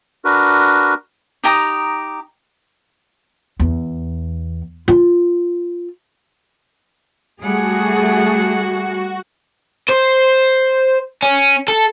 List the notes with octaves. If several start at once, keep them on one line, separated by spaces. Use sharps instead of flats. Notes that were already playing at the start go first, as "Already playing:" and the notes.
D4 F#4 A#4 B4
D#4 G4 A#5 D#6
E2
F4
G3 A3 F#4 G#4 F#5
C5
C#4
A4